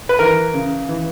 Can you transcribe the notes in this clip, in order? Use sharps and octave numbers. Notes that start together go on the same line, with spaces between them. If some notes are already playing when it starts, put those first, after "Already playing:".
B4
E3 A#4
C#3
E3